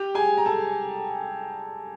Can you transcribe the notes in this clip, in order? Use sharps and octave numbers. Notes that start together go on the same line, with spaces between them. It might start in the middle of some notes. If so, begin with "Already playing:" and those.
Already playing: G4 G5
G#4 G#5
A#5
A4 A5